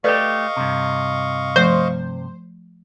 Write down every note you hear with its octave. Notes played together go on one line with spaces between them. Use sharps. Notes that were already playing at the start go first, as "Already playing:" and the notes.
A3 G4 A4 B4 D5 D#5 F5 C#6
G2 C3
F3 A3 C5